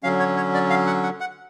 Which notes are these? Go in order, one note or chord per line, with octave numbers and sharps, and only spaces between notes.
D3 F#3 C#4 F5
C#5
C#5
D5
F5
F#5
F#5
F#5